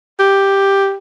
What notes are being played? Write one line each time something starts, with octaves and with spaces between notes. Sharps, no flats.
G4